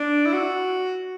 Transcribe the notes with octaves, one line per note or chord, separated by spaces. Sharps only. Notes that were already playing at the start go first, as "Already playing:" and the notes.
Already playing: D4
E4
F#4